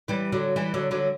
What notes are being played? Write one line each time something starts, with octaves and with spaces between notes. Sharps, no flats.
E3 G3
D3 F#3
E3 G3
D3 F#3
D3 F#3